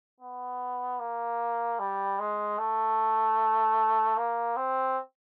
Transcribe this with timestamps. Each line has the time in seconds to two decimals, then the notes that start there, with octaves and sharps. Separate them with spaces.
0.21 B3
1.00 A#3
1.79 G3
2.19 G#3
2.58 A3
4.17 A#3
4.57 C4